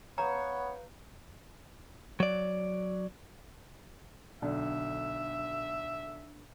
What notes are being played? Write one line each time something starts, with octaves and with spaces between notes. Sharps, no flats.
B3 B4 C#5 F5 A#5 G6
F#3 D5
B1 D3 D4 E5